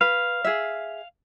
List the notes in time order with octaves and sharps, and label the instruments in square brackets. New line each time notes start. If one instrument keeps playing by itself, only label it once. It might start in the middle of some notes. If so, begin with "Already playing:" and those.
[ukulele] B4 [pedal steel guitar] F5
[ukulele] G#4 E5